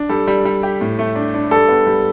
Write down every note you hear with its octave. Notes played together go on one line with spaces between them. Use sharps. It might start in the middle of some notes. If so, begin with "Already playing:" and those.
Already playing: D4
G3 A4
G3
G3
G4
A2
A3
D4
D4
G3 A4
B3
G3